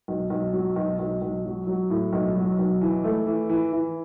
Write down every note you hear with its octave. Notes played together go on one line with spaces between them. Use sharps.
B1
B1
F#3
B1
B1
B1
F#3
F#3
A2
B1
F#3
B1
E3
A3
E3
E3
E3